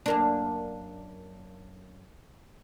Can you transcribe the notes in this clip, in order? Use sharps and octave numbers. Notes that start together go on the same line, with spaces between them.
F#2 A#3 D4